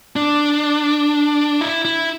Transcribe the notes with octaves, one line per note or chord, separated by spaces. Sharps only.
D4
E4
E4